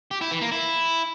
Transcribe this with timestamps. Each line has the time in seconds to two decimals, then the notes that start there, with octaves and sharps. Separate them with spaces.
0.11 G4
0.21 E4
0.31 E3
0.41 A#3
0.52 E4